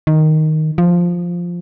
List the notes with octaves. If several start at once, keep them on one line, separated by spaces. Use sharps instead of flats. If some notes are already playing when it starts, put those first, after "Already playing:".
D#3
F3